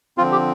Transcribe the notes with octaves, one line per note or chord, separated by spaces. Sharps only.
D3 F3 C4 F4
G4